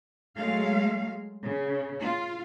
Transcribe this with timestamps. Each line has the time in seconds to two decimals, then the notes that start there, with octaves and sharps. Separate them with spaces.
0.37 F#3 G#3 A3 F5
1.45 C#3
2.01 F4